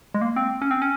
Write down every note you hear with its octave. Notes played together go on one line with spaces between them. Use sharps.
G#3
A#3
C4
C#4
C4
C#4